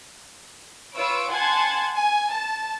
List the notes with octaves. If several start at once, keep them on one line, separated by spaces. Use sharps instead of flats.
F4 B4 C#5 E6 D7
F#5 G#5 A5 C6 G#6
G#5
A5